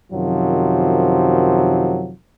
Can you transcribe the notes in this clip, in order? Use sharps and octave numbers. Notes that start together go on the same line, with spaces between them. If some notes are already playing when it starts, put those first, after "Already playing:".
F#2 C3 D#3 F3 F#3